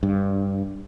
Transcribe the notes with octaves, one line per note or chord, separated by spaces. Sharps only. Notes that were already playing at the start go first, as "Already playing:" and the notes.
G2